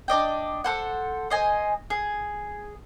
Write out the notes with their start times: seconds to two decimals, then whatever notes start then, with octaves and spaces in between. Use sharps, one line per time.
0.08 D4 D5 D#5 G5
0.64 A4 C5 F#5
1.30 C5 D#5 G#5
1.90 G#4